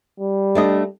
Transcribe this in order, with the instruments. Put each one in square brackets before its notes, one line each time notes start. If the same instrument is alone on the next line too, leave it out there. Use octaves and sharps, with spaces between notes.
[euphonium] G3
[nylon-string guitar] A3 D4 D#5